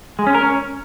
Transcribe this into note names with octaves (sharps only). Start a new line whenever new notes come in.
G#3
C#4
A#4
C#4